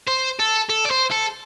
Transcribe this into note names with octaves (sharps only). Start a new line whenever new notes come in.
C5
A4
A4
D5
C5
A4